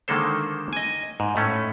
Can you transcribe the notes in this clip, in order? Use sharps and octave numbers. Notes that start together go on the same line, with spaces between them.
D3 D#3 G#3 A#3 A4 C5
D#5 G#5
G#2
A2 A3 C#4